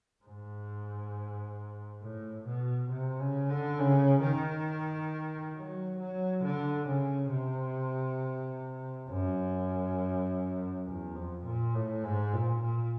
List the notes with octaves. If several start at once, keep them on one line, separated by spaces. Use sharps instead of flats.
G#2
A2
B2
C3
C#3
D3
C#3
D#3
F#3
F#3
D3
C#3
C3
F#2
E2
F2
A#2
A2
G#2
A#2
A#2